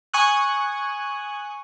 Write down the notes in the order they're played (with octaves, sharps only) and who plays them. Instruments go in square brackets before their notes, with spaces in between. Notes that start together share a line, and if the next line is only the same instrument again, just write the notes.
[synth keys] G#5 C#6 D#6 F#6